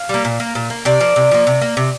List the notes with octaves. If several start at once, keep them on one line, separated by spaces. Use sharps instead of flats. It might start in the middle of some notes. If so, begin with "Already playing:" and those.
Already playing: F5
G3 A#3
A#2
A#3
A#2
A#3
C3 D5
F3 A#3
C3
F3 A#3
C3
A#3
C3